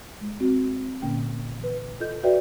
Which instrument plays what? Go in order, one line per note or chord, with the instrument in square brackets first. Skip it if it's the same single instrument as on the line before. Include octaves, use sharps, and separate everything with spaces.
[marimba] G#3
C4 F#4
A#2 D3 A#3 C#4 G5
E3 B4
F4 A4 D#5 G6
F#4 B4 D5 E5 G5